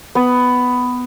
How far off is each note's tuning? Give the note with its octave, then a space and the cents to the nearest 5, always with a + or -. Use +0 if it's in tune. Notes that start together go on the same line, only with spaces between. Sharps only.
B3 +10